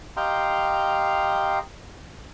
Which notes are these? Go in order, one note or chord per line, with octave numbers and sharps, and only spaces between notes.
G4 D#5 F5 G5 A#5 C6